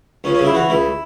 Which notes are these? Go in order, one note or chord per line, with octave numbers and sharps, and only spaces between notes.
C#2 C#4
C#4
C#3
E4
E3 F#4
C#2 E4